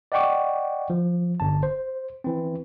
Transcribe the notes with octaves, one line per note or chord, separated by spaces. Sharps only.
D5 D#5 F#5 G5 C#6 D6
F3
G1 A5
C5
E3 C4